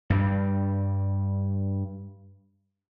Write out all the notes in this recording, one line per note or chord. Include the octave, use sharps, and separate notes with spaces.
G2 G3